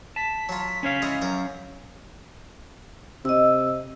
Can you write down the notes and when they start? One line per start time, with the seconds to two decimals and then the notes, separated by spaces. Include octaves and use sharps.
0.16 A5 B6
0.49 F#3 F4
0.83 C#4 C#5 F5
1.02 G#3 E4 G#4
1.22 F#2 A#4
3.25 C3 D#5 E6